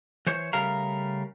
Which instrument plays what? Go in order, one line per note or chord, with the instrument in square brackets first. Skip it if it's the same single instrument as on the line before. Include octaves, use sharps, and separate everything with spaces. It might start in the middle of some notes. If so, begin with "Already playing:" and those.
[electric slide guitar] E3 C5 C#5
C#3 G3 A3 A#4 F5 A#5